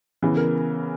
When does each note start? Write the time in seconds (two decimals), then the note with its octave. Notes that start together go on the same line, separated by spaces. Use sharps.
0.23 C#3 E3 B3
0.37 A#4